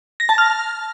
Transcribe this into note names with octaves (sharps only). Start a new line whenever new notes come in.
A#6
A5
F6